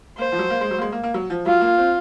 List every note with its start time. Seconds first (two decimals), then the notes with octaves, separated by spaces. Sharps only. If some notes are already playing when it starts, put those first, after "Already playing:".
0.18 A#3 C5
0.32 F3
0.39 F#3
0.50 A#3
0.61 G#3
0.71 F#3
0.78 A#3
0.81 G#3
0.92 A#3
1.03 A#3
1.14 F#3
1.30 F3
1.46 F#3 F4
1.61 A#3
1.78 C4